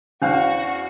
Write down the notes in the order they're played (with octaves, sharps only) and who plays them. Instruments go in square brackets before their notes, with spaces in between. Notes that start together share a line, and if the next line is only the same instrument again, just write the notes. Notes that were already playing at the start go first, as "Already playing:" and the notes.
[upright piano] E2 F5 [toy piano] C#4 D4 C5 [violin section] F#4